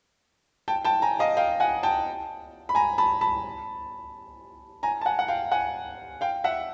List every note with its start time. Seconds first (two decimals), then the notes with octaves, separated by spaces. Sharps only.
0.68 G5 A5
0.85 G5 A5
1.02 G#5 A#5
1.19 D#5 F5
1.37 F5 G5
1.60 F#5 G#5
1.83 G5 A5
2.69 B5
2.75 G#5 A#5
2.98 A5 B5
3.21 A5 B5
4.83 G#5 A#5
5.01 A5
5.05 F#5 G#5
5.19 F#5
5.28 F5 G5
5.52 F#5 G#5
6.21 F5 G5
6.44 E5 F#5